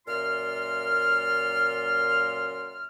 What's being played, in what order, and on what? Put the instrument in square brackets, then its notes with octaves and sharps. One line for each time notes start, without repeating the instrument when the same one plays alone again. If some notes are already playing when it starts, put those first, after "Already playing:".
[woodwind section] F#2 A#2 F4 C6 F6